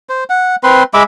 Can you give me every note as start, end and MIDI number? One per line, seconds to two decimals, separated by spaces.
0.09 0.24 72
0.30 0.56 78
0.63 0.83 60
0.63 0.83 71
0.63 0.83 84
0.94 1.03 56
0.94 1.03 76
0.94 1.03 83
0.94 1.03 86